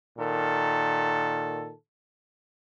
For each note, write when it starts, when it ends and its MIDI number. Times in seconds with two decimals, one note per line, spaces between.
0.18 1.72 46
0.18 1.72 51
0.18 1.72 69